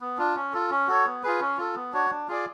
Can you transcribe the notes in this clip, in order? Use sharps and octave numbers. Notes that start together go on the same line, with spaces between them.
B3
D4 F4
C#4
F4 A4
C#4
F#4 A4 C#5
B3
F4 G#4 B4
C#4
F4 A4
B3
D4 F#4 C#5
D4
F4 G#4 D5